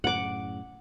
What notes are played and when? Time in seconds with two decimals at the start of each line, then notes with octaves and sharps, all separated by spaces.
0.04 F#2 A2 C#3 F#5 D6